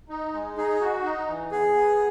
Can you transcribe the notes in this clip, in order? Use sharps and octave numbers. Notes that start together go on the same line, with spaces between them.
D#4
G#3
D#4 G#4
F#4
D#4
E3
B3 G#4
B3